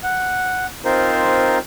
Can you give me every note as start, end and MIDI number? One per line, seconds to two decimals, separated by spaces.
0.03 0.66 78
0.85 1.58 60
0.85 1.58 63
0.85 1.58 65
0.85 1.58 70
0.85 1.58 72